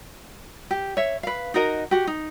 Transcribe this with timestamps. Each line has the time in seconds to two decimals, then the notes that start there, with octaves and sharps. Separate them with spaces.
0.71 G4
0.97 C#5 E5
1.23 B4 F5
1.54 D#4 F#4 A#4 D#5
1.91 F#4 G4
2.07 D#4